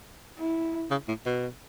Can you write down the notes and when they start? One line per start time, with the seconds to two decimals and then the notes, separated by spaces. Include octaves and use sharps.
0.38 E4
0.91 C#3
1.08 A2
1.26 B2